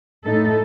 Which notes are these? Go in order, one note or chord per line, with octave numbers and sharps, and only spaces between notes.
A2 A3 D#4 A4